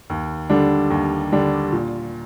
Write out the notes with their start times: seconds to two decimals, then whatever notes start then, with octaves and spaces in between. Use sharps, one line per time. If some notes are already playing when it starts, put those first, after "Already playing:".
0.10 D#2
0.50 D3 G3 D4
0.90 D#2
1.32 D3 G3 D4
1.72 A#2